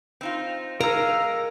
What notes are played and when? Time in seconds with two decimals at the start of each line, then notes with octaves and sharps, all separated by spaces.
0.21 C4 D#4 F4
0.81 G#3 D#4 A#4 F5 A#5 E6